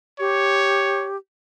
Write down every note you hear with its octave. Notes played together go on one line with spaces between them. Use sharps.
G4 C#5